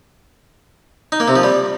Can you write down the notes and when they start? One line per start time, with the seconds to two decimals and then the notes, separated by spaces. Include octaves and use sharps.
1.12 D#4
1.20 A#3
1.28 C3
1.36 F3
1.43 G3